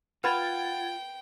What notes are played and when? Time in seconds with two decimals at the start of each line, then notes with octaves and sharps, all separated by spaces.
0.24 F4 B4 F#5 G5 B5 G#6 A6